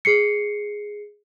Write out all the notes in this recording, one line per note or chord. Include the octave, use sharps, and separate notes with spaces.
G#4 C7 C#7